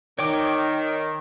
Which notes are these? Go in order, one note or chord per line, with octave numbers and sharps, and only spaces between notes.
D#3 C#5 G5 D6